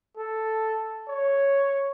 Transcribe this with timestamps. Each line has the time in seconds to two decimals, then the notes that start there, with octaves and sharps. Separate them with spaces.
0.17 A4
1.08 C#5